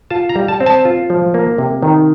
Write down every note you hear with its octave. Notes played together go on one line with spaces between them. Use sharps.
F4 A5
A#5
G3
A5
C4
A5
F4
F3
A#3
C3
D#3